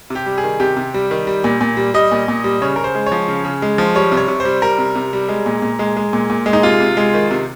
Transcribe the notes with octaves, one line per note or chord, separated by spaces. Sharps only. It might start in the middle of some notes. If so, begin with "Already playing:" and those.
C3
G4
G3
G#4
D#3
C3 G4
C3
G3
D#3
G3
A#2
A#2
G3
G3 D#5
A#2
A#2
G3
C#3 C#5
C#3 A#4
C5
G#3
C#5
F3
C#3
C#3
G#3
F3
G3 C#5
C3
C#5
C3
C5
G3
G3 A#4
C3
C3
G3
G#3
A#2
A#2
G#3
G#3
A#2
A#2
G#3
D#4
C3 F4
C3
G#3
D#3
C3